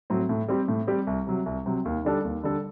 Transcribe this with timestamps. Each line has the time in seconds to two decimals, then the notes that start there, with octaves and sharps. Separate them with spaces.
0.10 A2 F#3 C4
0.29 A2
0.48 G3 C4 G4
0.68 A2
0.87 G3 C4 G4
1.07 C2
1.27 C3 F#3
1.46 C2
1.66 C3 F#3
1.85 D#2
2.05 D3 G3 D4 A4
2.25 D#2
2.44 D3 G3 D4 A4